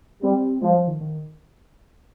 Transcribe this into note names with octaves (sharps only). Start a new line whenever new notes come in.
G3 C4
F3 G#3
G3
F3
D#3
D#3